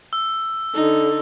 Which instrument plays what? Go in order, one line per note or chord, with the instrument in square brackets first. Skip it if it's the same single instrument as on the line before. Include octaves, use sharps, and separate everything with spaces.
[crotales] E6
[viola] D3 D#4